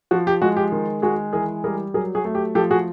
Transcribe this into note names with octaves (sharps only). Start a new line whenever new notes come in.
F3 F#4
G4
G#3 F#4
G4
D#3
G#3 F#4 G#4
E3 G#4 A#4
G3 G#4 A#4
F#3 G#4 A#4
F#4 G#4
A3
G4
F3 G4 A4
F#4 G#4